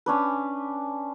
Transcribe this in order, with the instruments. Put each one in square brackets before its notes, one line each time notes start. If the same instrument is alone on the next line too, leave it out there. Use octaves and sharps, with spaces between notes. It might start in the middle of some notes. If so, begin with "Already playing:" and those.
[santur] C#4 D4 B4